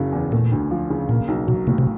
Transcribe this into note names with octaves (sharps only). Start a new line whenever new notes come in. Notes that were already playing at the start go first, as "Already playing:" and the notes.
Already playing: F#1 C#3 F#3
E2
A#2 A3
D2
F3
C#3
A#2 A#3
B1
B2 F#3
A2 C3
C3